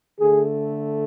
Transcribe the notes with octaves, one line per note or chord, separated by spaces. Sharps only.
D3 A3 G#4